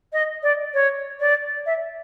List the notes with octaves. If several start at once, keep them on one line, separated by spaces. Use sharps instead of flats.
D#5
D5
C#5
D5
E5